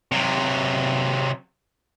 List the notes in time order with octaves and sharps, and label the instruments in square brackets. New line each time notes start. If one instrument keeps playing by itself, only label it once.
[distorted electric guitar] C3 F#3